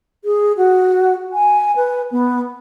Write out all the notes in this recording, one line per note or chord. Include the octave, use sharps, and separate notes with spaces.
G#4
F#4
G#5
B4
B3